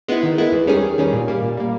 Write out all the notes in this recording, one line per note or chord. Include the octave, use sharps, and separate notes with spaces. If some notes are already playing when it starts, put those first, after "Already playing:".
G#3 B3 E4
D#3
G#3 B3 E4
E2
D#3 G3 C#4 G#4
E2
D#3 G3 C#4 G#4
A#2
G3 A#3
A#2
G3 A#3